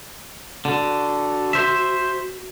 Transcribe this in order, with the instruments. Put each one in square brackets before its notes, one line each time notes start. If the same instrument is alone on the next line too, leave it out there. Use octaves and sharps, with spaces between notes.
[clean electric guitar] D3 [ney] F#4
[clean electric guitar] C5 E5